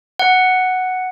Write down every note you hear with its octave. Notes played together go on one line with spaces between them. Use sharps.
F#5